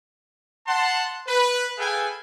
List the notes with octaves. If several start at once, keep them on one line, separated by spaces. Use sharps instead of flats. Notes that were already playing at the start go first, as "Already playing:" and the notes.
F#5 A5 C6
B4
G#4 A4 B4 F5 G5 G#5